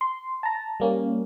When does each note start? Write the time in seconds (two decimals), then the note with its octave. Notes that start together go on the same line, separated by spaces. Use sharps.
0.01 C6
0.43 A5 A#5
0.80 G3 A#3 C#4